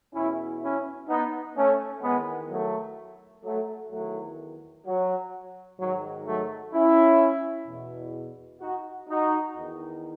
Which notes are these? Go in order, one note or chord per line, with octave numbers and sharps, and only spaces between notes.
E2 B2 C#4 E4
C#4 E4
B3 D#4
A3 C#4
E2 D#3 G#3 B3
F#3 A3
F#3 A3
E2 D#3 F#3 A3
F#3
G#2 D#3 F#3
F#3 A3
C#4 E4
E2 B2
D#4 F#4
D#4 F#4
E2 D#3